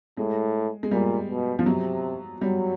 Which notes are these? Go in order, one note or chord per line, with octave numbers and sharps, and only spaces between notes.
A2 G#3
G#3
A#2 G3
B2
F3
C3 F#3
F#3 G3